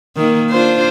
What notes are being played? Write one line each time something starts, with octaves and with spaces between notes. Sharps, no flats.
D#3 A#3
D4 F4 C5